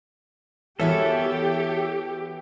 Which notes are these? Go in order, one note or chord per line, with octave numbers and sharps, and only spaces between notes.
E3 B3 F#4 G4 A4 A#4 C#5 E5